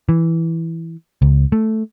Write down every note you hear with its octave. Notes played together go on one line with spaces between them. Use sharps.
E3
C#2
A3